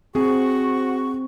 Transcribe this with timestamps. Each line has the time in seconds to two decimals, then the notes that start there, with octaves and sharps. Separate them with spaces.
0.15 C4 F#4 G#4 C#6